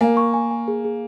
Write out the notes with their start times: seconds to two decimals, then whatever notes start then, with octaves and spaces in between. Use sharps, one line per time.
0.01 A#3 G#5
0.17 C#6
0.34 G#5
0.51 G#5
0.68 G#4
0.84 G#4